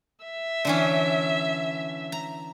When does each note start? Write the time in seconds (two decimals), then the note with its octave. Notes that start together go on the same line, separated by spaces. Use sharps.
0.25 E5
0.65 D3 E3 C#4
2.12 A#5